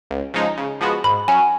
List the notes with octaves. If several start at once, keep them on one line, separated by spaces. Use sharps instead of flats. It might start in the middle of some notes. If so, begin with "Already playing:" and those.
C#2
C#3 F3 G#3 D#4
C#3
F3 G#3 B3 F#4
G#2 B5
F#3 C#4 F#4 G#5